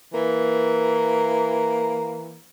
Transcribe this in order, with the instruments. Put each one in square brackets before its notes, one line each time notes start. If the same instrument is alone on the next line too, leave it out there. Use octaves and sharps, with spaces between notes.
[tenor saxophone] E3 [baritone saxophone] A#3